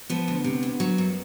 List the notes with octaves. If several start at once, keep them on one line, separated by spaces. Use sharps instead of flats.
F3 B3
D2
C3
D2
F#3
F#2